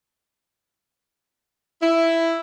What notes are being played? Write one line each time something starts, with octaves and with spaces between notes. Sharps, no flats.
E4